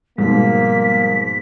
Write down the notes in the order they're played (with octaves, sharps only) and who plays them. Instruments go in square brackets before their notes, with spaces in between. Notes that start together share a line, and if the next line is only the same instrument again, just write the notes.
[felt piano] G#2 B2 [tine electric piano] F3 G3 G#3 [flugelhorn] A#3 [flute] B6